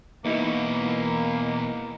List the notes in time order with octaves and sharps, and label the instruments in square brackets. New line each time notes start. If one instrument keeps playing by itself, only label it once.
[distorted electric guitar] E2 B2 [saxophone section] A#3 [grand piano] B3 D#4 E4